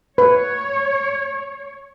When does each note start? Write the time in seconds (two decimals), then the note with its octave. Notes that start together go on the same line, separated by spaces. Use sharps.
0.18 B4 C#5